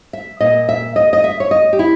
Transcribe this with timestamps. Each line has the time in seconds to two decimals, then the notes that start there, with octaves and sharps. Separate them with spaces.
0.13 E5
0.40 A#2 D#5
0.69 E5
0.96 D#5
1.13 D#5
1.24 E5
1.40 C#5
1.51 D#5
1.73 G4
1.79 E4